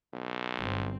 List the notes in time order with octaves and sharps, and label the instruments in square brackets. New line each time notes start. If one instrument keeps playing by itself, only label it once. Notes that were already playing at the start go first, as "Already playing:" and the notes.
[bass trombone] B1
[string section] G1 C4